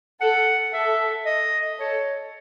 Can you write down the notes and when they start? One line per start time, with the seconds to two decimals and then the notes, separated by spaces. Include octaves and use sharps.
0.21 A4 F#5
0.73 A4 E5
1.25 D#5
1.79 A4 C#5